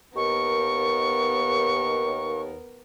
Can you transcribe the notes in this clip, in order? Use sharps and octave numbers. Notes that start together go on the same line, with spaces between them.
D#2 B3 A#4 C#6